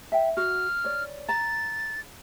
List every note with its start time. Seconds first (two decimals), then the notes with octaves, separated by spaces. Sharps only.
0.12 E5 G5
0.37 F#4 F6
0.84 C#5 D5
1.29 A#5 A6